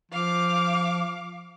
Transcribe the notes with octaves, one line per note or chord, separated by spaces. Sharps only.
F3 F5 D6